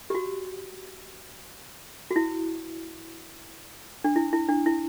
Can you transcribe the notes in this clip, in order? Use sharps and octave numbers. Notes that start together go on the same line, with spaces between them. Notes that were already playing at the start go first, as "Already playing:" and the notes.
G4
F#4
F#4
E4
D4
E4
E4
D4
E4